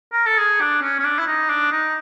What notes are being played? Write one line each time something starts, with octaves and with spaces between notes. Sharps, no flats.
A#4
A4
G#4
D4
C#4
C#4
D4
E4
D#4
D4
D#4